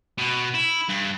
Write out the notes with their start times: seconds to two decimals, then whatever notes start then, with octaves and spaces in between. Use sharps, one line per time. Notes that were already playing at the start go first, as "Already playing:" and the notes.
0.18 B2
0.55 E4
0.89 G2